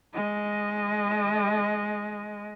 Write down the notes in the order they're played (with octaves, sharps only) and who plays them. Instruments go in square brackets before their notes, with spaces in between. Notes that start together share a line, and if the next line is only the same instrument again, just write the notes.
[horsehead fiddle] G#3 D#5